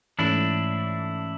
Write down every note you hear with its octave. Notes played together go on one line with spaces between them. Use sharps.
G#2 E3 A3 C#4 D4 E4